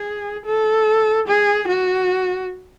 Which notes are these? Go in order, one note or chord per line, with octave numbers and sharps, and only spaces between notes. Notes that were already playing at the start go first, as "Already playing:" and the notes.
Already playing: G#4
A4
G#4
F#4